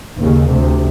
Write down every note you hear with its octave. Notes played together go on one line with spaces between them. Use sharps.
D#2 C#3
D2 C3